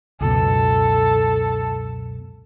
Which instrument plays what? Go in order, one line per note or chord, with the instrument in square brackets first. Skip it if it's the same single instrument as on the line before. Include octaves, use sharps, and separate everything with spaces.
[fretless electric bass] C#2 F#2 B2 [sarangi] A4